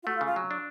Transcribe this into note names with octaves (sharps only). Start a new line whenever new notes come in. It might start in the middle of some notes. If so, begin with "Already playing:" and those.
F4
A3 F#4
F4
C#3
F4
F#3
D4